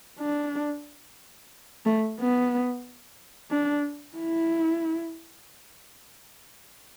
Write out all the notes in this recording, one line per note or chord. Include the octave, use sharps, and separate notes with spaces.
D4
A3
B3
D4
E4